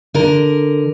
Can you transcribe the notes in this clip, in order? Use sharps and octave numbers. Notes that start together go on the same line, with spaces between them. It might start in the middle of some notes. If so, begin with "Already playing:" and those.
D3 A#4